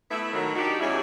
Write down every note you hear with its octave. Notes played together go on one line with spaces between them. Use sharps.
A3 B3 E4
A2 D#3 F#3
D4 D#4 F#4 G4
E2 G3 C#4 E4 G#4